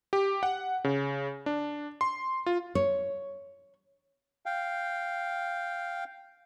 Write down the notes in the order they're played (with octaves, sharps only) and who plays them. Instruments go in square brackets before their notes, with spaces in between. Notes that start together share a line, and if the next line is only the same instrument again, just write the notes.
[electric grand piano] G4
F#5
C#3
D4
C6
F4
[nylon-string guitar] C#5
[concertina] F5 G5